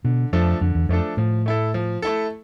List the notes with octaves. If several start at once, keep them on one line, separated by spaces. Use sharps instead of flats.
B2 D3
F2 F3 A3 D4 A4
F2 D3
E2
F2 F3 A3 D4 A4
A2 F3
A3 E4 A4
F3
A3 E4 A4